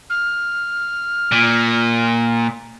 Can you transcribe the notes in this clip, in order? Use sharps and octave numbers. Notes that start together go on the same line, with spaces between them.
F6
A#2